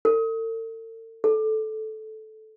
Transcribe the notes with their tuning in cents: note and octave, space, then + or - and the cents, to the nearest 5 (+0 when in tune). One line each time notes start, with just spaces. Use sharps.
A4 +45
A4 -15